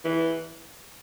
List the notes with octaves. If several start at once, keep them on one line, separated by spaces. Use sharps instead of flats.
E3